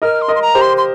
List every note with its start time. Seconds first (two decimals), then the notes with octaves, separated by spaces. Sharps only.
0.02 A#4 D#5 F6
0.22 C6
0.28 A#4 D#5
0.35 C6
0.42 A#5
0.55 G4 C5
0.61 C6
0.77 C6